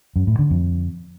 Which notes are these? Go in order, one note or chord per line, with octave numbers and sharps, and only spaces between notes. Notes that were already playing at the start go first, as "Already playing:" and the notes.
F#2
A2
D3
F2